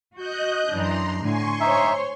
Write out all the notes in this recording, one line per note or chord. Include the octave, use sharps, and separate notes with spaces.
F#4 D#5 F#6 G6
F#2 E3 D4 A#5 C6
A2 D3 G#5 C6 C#6
D#4 C5 C#5 E5